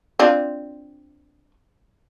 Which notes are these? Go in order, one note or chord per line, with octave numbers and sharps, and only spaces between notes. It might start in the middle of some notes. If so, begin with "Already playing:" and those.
C4 D4 F4